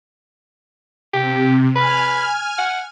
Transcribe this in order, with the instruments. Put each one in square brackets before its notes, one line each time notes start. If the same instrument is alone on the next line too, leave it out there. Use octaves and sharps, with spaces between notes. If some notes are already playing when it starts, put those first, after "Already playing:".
[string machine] C3 [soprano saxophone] G4
[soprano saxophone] B4 [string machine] G#5 F6
[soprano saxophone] F#5